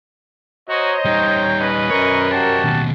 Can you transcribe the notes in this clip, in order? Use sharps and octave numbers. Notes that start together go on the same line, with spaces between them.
F#4 C5 C#5 D#5 A#5
G3 D#4 G5
C#4 B4 D#5
F#2 A#4 C5 C#5 C#6
C#4 F#4 G4 A5
D#2 B2